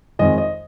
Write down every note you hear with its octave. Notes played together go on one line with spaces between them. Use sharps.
F2 D#3 G#3 D#5
D#5